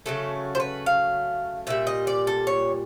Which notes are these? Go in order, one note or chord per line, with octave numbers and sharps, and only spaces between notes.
C#3 F#3 A3 A4
C5
B4
F5
A#2 G3 E5
D#5
D5
A4
C#5